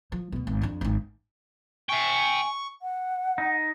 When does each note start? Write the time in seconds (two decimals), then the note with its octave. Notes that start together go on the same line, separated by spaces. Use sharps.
0.12 F3
0.32 D2 B2
0.47 G#1
0.62 F2 D4
0.81 G#1 D#4
1.89 E5 G5 G#5 C#6
2.82 F#5
3.38 D#4